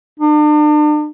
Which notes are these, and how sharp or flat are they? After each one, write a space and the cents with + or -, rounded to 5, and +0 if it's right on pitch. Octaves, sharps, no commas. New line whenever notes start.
D4 +40